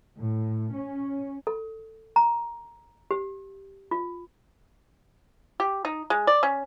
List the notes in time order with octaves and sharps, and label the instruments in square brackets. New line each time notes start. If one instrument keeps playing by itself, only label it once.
[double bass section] A2
C#4
[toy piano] A4
A#5
G4
F4
[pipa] G4
D#4
G#3
D5
C#4